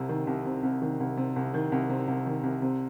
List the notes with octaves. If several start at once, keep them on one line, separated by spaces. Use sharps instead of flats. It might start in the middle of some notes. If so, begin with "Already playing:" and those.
Already playing: C2 C3
D#3
C2
C3
C2
D#3
C2
C3
C2
D#3
C2
C3
C2
D#3
C2
C3